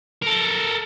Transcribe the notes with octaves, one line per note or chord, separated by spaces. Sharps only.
A4 A#4